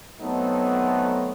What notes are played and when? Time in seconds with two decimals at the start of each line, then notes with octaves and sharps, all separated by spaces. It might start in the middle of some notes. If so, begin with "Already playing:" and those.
0.20 F#3 A3 B3 C4 D#4 A4